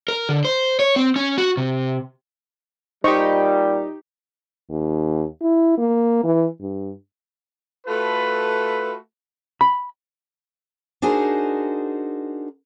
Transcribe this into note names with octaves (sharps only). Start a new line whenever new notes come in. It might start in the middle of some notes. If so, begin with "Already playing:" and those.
A#4
D3
C5
C#5
C4
C#4
F#4
C3
A#2 G3 D#4 G4 C5 D#5 C#6
D#2
E4
A#3
E3
G2
A3 F4 F#4 A4 B4
B5
D4 D#4 F#4 G#4 A#4 C5